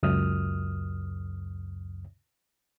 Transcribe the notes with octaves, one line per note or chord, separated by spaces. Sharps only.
C#2 F#2 D#6 F6